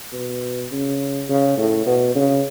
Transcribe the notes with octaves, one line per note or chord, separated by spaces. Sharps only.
B2
C#3
C#3
A2
B2
C#3